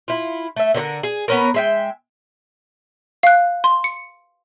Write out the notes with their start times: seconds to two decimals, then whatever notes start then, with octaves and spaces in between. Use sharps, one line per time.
0.08 E4 F4
0.56 A3 E5
0.74 D3 A#4 C#5 F#5
1.03 G#4
1.28 B3 C#4 A#4
1.54 G#3 E5 G5
3.23 F5 F#6
3.64 C6
3.84 C#7